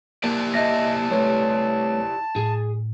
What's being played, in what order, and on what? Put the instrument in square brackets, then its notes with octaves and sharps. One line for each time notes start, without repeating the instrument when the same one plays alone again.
[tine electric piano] A#3 [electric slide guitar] E4 G4 D5 [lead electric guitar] A5
[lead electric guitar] A#3 [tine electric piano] D#5 E5 A#6 [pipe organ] A5
[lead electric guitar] G3 C4 [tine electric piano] A3 B4 C#5
[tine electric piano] A2 [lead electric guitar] G#4